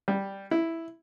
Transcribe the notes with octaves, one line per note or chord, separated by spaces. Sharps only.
G3
E4